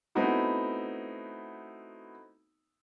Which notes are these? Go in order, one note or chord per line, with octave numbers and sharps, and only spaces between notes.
A3 B3 C4 D#4 E4 F#4